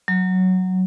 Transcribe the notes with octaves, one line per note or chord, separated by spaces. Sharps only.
F#3